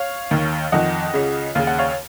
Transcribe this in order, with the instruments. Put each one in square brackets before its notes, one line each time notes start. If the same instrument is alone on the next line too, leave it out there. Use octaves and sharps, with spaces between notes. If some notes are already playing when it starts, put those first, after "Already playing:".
Already playing: [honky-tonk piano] C#5 F5
D#2 D#3
F2 D#3 D#5 F#5
C#2 C#3
D#2 C#3 F5
F#5
C#5 F5